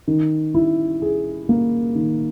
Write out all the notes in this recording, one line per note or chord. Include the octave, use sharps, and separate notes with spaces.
D#3
E4
G#4
A#3
D#3